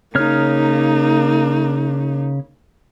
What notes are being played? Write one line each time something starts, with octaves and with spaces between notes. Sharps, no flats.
C#3 A#3 D#4 C#5 F6